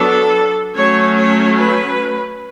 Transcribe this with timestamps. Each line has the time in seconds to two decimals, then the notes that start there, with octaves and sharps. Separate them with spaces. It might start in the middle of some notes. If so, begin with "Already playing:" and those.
Already playing: F#3 B3 D4 A4
0.75 F#3 A3 C#4 C#5
1.17 C#5
1.59 B4